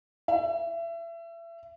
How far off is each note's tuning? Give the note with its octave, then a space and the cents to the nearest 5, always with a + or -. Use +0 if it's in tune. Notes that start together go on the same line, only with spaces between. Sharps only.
E5 +30